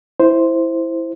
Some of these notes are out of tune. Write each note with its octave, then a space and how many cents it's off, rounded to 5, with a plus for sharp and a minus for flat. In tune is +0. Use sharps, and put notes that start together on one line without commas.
E4 +0 C5 +0